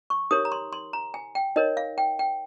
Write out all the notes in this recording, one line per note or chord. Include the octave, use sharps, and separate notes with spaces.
C#6
D#4 G4 A#4 C#5 D#6
A#5
C6
C6
A#5
G#5
G5
D#4 A#4 C#5 D#5
F5
G5
G5